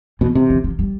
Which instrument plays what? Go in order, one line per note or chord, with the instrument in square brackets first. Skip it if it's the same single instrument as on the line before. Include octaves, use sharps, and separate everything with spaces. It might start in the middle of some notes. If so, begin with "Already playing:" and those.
[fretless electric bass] B2 [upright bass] E3
[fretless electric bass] C3
[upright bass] E3
F3
G3